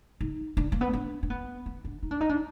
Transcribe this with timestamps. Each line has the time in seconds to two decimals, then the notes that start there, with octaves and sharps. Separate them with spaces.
0.21 D#4
0.57 D4
0.72 A#3
0.81 B3
0.93 D4
1.23 D4
1.30 B3
1.66 B3
1.85 D4
2.03 D#4
2.11 D4
2.21 D#4
2.29 D4